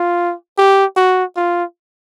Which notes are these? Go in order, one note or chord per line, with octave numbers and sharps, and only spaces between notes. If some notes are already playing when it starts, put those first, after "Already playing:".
Already playing: F4
G4
F#4
F4